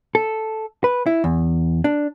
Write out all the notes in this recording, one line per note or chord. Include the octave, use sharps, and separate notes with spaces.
A4
B4
E4
E2
D4